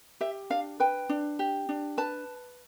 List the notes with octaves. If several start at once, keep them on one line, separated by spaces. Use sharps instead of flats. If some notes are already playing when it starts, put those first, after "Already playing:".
G4 E5
D4 F5
B4 G5
D4
G4
D4
B4 A5